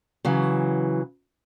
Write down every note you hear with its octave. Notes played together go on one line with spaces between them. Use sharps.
C#3 E3 F#3